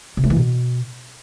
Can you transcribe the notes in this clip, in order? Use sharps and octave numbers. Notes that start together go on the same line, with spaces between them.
C3
A3
E3
B2